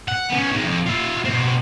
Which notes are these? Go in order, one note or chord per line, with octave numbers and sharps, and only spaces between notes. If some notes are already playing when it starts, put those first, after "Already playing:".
F#5
B3 C#4
D#3 G#3
F2
F4 E5
B2 C4